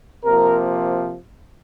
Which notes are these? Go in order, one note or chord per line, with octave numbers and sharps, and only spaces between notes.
C3 F3 A#3 A#4